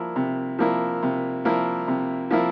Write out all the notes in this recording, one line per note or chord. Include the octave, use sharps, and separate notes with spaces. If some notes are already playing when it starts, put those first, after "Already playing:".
Already playing: F3 A#3 E4
C3
F3 A#3 E4
C3
F3 A#3 E4
C3
F3 A#3 E4